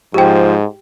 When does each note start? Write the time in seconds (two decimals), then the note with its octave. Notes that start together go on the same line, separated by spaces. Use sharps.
0.14 G#2 F3 G4 G5